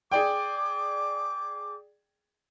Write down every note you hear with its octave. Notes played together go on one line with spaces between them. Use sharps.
G#4 D5 G5 D6